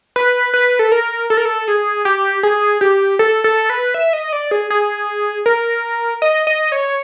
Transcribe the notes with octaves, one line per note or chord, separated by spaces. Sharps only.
B4
B4
A4
A#4
A4
A#4
A4
G#4
G4
G#4
G4
A4
A4
B4
E5
D#5
D5
G#4
G#4
A#4
D#5
D#5
C#5